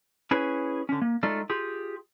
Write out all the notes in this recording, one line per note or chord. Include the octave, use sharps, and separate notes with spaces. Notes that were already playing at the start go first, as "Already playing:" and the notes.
C#4 E4 G#4 B4 C#5
D3 C#4
A#3
G#3 A3 D#4 F4 A4 D5
F4 G4 G#4